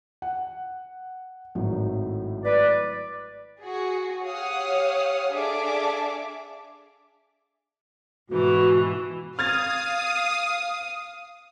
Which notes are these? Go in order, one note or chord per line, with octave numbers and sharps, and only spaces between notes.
F#5
G#1 A2 F#3
B4 D5
F#4 G#4
G4 C#5 F5 F#5 D#6
D4 G#4 A4 E5 F5 D6
G#2 B2 E3 F#4
F5 D#6 F6 G#6 A6